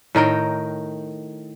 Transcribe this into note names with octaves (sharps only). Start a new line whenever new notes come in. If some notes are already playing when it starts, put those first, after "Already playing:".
A2 D#3 A#4 G5